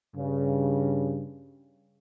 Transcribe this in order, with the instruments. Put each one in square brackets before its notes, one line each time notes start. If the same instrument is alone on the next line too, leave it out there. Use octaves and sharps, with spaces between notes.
[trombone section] G2 C#3